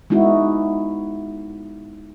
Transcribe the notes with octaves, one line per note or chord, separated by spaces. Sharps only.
G#3 B3 D#4 E4 F#4